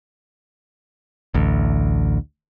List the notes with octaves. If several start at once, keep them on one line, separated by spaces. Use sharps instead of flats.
A1 D2